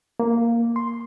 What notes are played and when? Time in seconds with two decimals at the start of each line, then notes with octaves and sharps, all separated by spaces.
0.20 A#3
0.76 C6